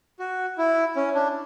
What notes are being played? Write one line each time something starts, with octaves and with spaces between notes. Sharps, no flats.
F#4
E4
C#4
D4